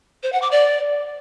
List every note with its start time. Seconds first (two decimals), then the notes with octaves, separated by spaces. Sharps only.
0.23 C5
0.33 F#5
0.42 D6
0.51 D5